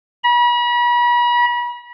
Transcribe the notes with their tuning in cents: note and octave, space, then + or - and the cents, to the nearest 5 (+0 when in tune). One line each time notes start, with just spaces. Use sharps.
B5 -40